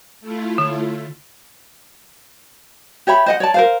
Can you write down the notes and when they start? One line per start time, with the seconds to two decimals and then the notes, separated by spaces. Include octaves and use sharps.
0.21 A3 E4 F4
0.58 D3
3.07 G4 C#5 E5 B5
3.26 C5 D#5 F#5
3.40 C#5 D5 A5
3.54 A#4 C5 F5